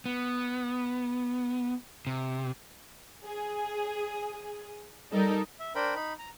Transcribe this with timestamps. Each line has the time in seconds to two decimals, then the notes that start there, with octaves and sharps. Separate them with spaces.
0.06 B3
2.07 C3
3.24 G#4
5.12 G3 D#4 A4 A#4
5.60 E5
5.75 D4 A#4 C5 G5 B5
5.96 D#4 B5
6.19 A#5